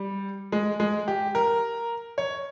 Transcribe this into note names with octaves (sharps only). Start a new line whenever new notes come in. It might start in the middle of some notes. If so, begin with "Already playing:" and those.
Already playing: G3
G#3
G#3
G4
A#4
C#5